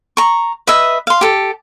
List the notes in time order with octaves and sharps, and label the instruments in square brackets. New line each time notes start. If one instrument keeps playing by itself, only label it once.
[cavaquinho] A#5 C#6
B4 D#5 E5
F5 C6
G4 A4